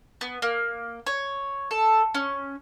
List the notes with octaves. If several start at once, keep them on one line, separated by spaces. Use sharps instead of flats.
B3
A#3
C#5
A4
C#4